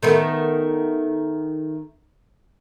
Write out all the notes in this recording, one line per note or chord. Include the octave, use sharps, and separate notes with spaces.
D#3 A3 B3